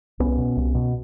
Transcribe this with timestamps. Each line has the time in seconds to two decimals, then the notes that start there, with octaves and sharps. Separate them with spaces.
0.20 C2 B3 C#4
0.38 B2
0.57 C2
0.75 B2